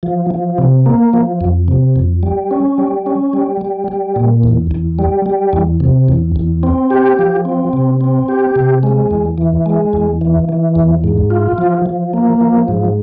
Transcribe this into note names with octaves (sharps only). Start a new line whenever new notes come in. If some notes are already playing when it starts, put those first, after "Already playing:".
F3
F3
C3
A#3
F3
F2
C3
F2
G3
C#4
G3
C#4
G3
G3
G3
A#2
E2
E2
G3
G3
E2
C3
E2
E2
C4
G4
F3
C4
C3
C4
G4
C3
G#3
E2
E3
G#3
E2
E3
E3
E2
G#2
F4
F3
F3
A#3
F3
G#2